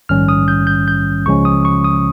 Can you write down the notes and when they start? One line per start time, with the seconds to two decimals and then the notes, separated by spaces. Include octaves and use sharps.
0.09 A#1 G#2 D#3 G3 C#4 F6
0.29 D#6
0.48 G6
0.67 G6
0.88 G6
1.26 C#2 C#3 F3 G#3 C#4 C#6
1.45 D#6
1.65 C#6
1.84 D#6